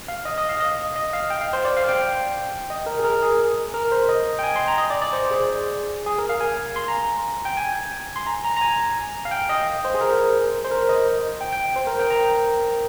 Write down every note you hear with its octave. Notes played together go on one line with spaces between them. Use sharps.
F5
D#5
D#5
F5
D#5
D#5
F5
G5
F5
C5
D5
F5
G5
D#5
A#4
G#4
A#4
G#4
A#4
C5
D#5
G5
G#5
C6
A#5
D#5
D5
D5
C5
G#4
G#4
A#4
F5
G#5
C6
A#5
G5
G#5
C6
A#5
A#5
A#5
G#5
F5
G5
D#5
C5
G#4
A#4
C5
A#4
D#5
G5
G5
C5
A#4
G5
A#5